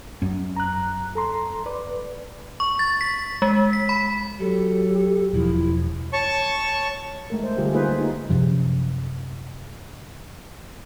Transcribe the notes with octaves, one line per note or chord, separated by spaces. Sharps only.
F#2 C#4
A#5 F#6
A4 A#5 C6
B4 D5
C#6
A6
B6
G#3
B6
B5
F#3 G4 A4
E1 F3 E4
C#5 A5 C#6
G#3 A3 A#4
C5
D3 G3 G#3 F4 G4 G#4
A#3 D#4 F4 G#4 B4 C5
G#3 A#3 D#4 F4
F#2 C3 F3